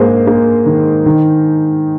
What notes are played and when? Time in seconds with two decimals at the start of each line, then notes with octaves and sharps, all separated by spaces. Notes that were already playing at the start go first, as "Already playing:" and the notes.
Already playing: G#2 A#3 G#4 C5
0.27 A#3
0.66 D#3
1.06 D#3